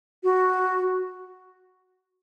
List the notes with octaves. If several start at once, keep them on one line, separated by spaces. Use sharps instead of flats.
F#4